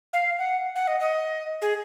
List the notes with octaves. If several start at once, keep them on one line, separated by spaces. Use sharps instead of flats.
F5
F#5
F#5
D#5
D#5
G#4